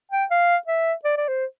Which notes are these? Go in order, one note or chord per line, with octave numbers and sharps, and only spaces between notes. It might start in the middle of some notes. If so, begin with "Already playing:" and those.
G5
F5
E5
D5
D5
C5